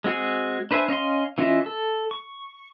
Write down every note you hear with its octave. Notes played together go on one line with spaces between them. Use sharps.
G#3 C4 F#4 G#4 G#5
D4 B4 C5 E5 G#5
C#4 D#5 F5 C6
E3 C#4 F4 D#5 E5
A4
C#6